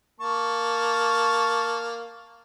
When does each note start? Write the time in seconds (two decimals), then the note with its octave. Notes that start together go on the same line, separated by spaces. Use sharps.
0.20 A#3 A5 C#6